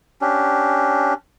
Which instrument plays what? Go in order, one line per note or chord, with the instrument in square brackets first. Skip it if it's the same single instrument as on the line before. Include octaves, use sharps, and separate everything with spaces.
[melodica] C#4 D4 G4